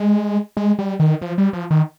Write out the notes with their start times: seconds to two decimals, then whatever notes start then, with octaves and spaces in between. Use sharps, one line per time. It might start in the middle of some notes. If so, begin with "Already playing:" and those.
Already playing: G#3
0.57 G#3
0.79 G3
1.00 D#3
1.22 F3
1.38 G3
1.53 F3
1.71 D#3